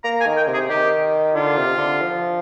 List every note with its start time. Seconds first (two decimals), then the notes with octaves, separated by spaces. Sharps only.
0.04 A#3 A#5
0.21 G#5
0.26 D#3
0.37 G5
0.47 C3
0.54 G#4
0.70 D#3 G4
1.35 D3 F4
1.57 C3
1.78 D3
2.01 F3